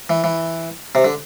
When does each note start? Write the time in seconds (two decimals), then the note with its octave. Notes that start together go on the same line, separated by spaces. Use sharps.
0.10 E3
0.24 E3
0.95 C3
1.05 D3